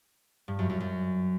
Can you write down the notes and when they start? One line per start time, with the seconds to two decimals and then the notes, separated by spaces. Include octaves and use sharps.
0.48 G2
0.59 F#2
0.70 F#2
0.80 F#2